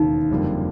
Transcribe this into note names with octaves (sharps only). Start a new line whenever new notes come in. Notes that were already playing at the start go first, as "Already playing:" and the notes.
Already playing: E1 D#2 C#3 D#4
F#1 F2 D3 G3 A#3